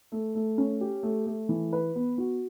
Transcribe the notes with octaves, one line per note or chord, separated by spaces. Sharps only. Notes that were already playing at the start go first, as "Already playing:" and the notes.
A3
A3
C#4
G4
A3
A3
E3
B4
B3
F#4